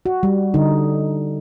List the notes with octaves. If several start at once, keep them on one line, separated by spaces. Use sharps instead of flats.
F#4
G3
D3 D#4